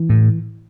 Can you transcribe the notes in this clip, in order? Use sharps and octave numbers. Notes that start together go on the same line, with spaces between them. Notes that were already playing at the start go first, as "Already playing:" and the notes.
Already playing: E3
A2